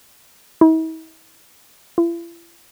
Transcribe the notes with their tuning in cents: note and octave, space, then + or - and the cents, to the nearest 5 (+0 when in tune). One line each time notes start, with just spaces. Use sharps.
E4 -45
E4 +45